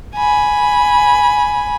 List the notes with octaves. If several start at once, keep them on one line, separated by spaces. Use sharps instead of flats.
G#5 B5